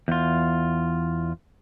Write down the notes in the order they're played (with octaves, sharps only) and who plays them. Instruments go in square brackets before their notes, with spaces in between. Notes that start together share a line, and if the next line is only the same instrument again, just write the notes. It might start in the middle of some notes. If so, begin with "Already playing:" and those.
[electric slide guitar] E2 F4